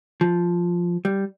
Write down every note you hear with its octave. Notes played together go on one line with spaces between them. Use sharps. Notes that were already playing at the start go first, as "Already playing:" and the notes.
F3
G3